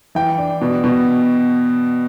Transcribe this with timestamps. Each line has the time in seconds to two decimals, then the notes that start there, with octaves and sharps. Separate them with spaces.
0.15 E3 G5
0.38 D4
0.61 B2
0.84 B2